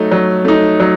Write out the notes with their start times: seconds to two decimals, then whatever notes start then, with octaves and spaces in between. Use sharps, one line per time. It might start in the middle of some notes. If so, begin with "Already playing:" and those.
Already playing: F#3 A3 D#4
0.12 F#3
0.45 A3 D#4
0.80 F#3